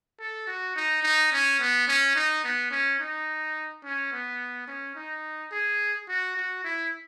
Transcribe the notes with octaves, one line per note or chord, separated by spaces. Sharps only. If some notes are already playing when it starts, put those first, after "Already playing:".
A4
F#4
D#4
D#4
C#4
B3
C#4
D#4
B3
C#4
D#4
C#4
B3
C#4
D#4
G#4
F#4
F#4
E4